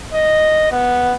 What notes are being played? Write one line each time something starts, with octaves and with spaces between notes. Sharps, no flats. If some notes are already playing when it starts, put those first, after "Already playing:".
D#5
B3